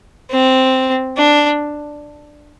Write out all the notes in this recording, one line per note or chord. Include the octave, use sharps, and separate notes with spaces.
C4
D4